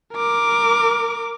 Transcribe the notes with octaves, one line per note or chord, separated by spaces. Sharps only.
A#4 D6